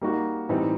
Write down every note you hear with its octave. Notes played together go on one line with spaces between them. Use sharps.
G3 A#3 D#4 F#4
A2 E3 G3 C4 D#4